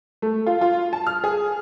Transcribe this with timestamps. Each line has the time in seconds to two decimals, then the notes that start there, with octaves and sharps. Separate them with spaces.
0.22 A3
0.46 F4
0.61 F4
0.93 A5
1.07 F6
1.24 G#4